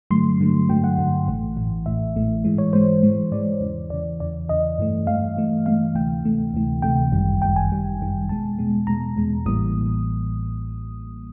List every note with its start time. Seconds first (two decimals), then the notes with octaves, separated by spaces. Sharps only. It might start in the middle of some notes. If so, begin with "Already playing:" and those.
0.11 G2 D3 F#3 A3 C6
0.40 G2 D3 F#3 A3
0.69 G2 D3 F#3 A3 G5
0.84 F#5
0.98 G2 D3 F#3 A3
1.27 A1 A2 E3 A3
1.56 A1 A2 E3 A3
1.86 A1 A2 E3 A3 E5
2.15 A1 A2 E3 A3
2.44 G#2 E3 G#3
2.58 C#5
2.73 G#2 E3 G#3 C5
3.03 G#2 E3 G#3
3.32 G#2 E3 G#3 D5
3.61 E2 C#3 E3
3.90 E2 C#3 E3 D5
4.20 E2 C#3 E3 D5
4.49 E2 C#3 E3 D#5
4.78 G2 E3 A3
5.07 G2 E3 A3 F5
5.37 G2 E3 A3
5.66 G2 E3 A3 F5
5.95 D2 C3 E3 A3 G5
6.25 D2 C3 E3 A3
6.53 D2 C3 E3 A3
6.82 D2 C3 E3 A3 G5
7.11 G1 F#2 D#3 G3
7.41 G1 F#2 D#3 G3 G5
7.56 G#5
7.71 G1 F#2 D#3 G3
7.99 G1 F#2 D#3 G3
8.29 E2 B2 G#3 A5
8.59 E2 B2 G#3
8.87 E2 B2 G#3 A#5
9.16 E2 B2 G#3
9.45 A1 A2 E3 G3 A#3 D#6